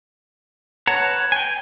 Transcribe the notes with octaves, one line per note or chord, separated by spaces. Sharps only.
B4 C#5 F#5 A5 A#5
G5 G#5